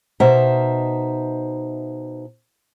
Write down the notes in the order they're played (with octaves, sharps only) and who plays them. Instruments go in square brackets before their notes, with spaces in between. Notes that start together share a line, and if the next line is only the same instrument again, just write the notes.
[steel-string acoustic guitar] B2 D#4 C5 E5 A#5